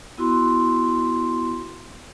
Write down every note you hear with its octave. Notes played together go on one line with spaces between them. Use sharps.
B3 E4 F#4 C6